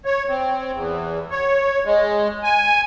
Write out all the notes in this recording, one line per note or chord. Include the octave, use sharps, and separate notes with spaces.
C#5
C4
E2
C#5
G#3
G#5